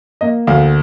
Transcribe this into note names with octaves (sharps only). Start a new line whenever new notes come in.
A#3 D#5
D2 F5